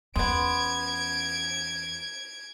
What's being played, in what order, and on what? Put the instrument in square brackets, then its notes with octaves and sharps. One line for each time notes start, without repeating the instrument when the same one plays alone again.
[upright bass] E2 C#4 [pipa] G#3 B3 [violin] G#6 D7